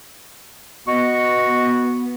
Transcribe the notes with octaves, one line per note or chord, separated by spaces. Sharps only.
B3 F#4 D#5 C#6